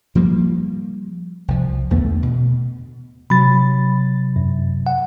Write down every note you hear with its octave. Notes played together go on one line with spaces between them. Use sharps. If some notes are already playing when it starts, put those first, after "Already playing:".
F3 G3 A#3
C2 F3
E2 D3 A3 B3
B2
C3 F#3 B5 A6
F#2
F#5